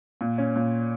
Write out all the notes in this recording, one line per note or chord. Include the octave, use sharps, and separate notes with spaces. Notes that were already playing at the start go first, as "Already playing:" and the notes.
A#2
C#4
A#2